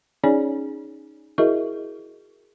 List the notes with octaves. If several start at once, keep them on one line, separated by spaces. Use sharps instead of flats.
C#4 D#4 G#4 C#5 D5 G#5
E4 F#4 G#4 A#4 D#5 E5